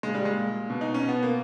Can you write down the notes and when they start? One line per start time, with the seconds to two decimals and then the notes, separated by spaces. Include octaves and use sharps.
0.03 A#2 G#3
0.15 G3
0.25 G#3
0.37 A#2
0.70 B2
0.81 D#4
0.94 C#4
1.03 B2
1.09 B3
1.23 A#3